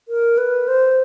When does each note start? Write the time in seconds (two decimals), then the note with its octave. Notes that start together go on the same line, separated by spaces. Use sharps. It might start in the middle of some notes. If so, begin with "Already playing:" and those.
0.08 A#4
0.38 B4
0.68 C5